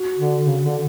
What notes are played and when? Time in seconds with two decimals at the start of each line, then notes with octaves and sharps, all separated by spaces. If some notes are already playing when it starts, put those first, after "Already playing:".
Already playing: F#4
0.18 D3
0.45 C#3
0.63 D3